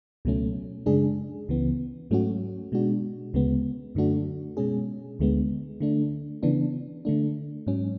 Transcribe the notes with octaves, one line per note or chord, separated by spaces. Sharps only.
C#2 B2 F#3 A3 C#4
F#2 C#3 G#3 D4 G#4
C#2 C#3 E3 B3
G#2 F#3 A3 C#4 F#4
B2 G#3 D4 F#4
D2 C#3 G#3 B3
F#2 D3 A3 D4 F#4
B2 G#3 C#4 G#4
D2 D3 G#3 B3
D3 A3 D4
C#3 E3 B3 D4
D3 A3 D4
G#2 F#3 C#4